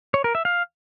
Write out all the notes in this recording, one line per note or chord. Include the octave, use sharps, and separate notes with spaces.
C#5
A#4
E5
F5